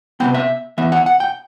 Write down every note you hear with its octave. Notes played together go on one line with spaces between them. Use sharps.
C3 F#3 B3 G5
E5
E3 B3 E5
F#5
F#5
G5